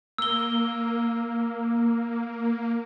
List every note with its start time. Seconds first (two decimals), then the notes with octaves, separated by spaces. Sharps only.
0.18 A#3 E6 G7